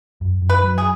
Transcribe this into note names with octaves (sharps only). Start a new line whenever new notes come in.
F#2
F#2
B4
F#3
G#4